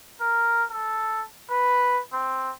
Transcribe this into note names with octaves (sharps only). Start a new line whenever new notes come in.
A#4
A4
B4
C4